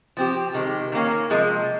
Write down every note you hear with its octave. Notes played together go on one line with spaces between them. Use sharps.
F3 C4 G4
C3 D#3 G#3
D#3 A#3 C#4
C3 F3 G#3